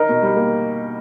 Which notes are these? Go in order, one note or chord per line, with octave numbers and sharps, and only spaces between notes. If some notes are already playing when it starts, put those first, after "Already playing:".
Already playing: D#4 A#4
B2
G3
A#3